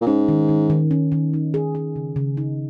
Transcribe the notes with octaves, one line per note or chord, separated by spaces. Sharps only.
A#2
G#2 C#4
D#3
D#3
D#3
C#4
D#3
D#4
G#4
G#4
C#3
C#3
D#4